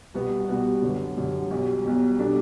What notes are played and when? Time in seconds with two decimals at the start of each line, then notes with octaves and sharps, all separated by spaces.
0.14 C2 B2 G3 B3 F#4
0.49 C2 B2 G3 B3 F#4
0.82 F#2 D3 G3
1.17 F#2 D3 G3
1.51 B1 B2 G3
1.85 B1 B2 G3
2.18 B2 G3 D4 A4